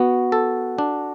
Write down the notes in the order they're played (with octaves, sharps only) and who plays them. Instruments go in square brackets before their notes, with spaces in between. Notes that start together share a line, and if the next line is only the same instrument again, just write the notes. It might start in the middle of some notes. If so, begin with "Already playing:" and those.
Already playing: [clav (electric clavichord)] B3 [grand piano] F#4
[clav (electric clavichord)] A4
D4